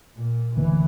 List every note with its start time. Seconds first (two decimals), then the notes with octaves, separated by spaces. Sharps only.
0.16 A#2
0.56 E1 D2 D3 E3 A#3